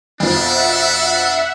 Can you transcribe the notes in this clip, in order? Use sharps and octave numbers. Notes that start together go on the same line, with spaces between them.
F2 B2 F3 D4 E5 F#5